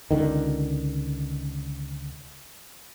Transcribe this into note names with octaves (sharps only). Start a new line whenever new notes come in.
C#2 D3 D#3